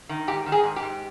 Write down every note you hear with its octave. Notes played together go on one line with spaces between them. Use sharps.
D#3
G#2 G4
D#3
G#4
G#2
G4
G#2